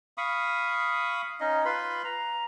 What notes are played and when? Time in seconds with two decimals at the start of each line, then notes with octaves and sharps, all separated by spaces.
0.18 F5 B5 C#6 D#6
1.40 C#4 D#4 D#5
1.65 F4 B4 B5 C6
2.04 A#5